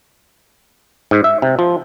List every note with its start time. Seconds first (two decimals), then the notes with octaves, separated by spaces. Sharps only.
1.11 G#2
1.24 E5
1.42 C3
1.59 F3